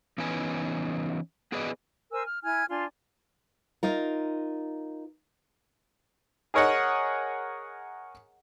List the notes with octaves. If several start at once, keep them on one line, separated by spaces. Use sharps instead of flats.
E3 B3 C#4 D#4 B4 G#5
B3 G#4 B4 D5 D#5
A#4 C5 G#5 E6
F6
E4 G#5 F6 G#6
D4 F4 G#5 C6
D#4 F4 A#4
G#4 A#4 C#5 D#5 F#5